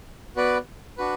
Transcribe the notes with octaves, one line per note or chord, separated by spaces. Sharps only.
B3 F#4 B4 D5
D4 F#4 B4